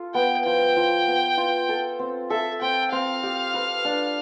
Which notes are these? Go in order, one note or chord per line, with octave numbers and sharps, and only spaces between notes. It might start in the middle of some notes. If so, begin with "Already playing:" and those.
Already playing: F4 A4
B3 G5
F3 G5
F3
B3
F4
A4
C4
A4 E5
C4 G5
C4 F5
G4
B4
D4